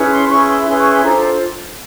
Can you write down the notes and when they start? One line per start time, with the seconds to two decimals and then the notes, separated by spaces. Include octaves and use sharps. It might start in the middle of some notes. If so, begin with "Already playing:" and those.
Already playing: C#4 E4 G#4 B4
0.11 C6
0.29 C#4 E4 G#4 B4 C#6
0.48 C6
0.66 C#4 E4 G#4 B4 C6
0.79 C#6
0.91 C6
1.03 D4 F4 A4 C5 A#5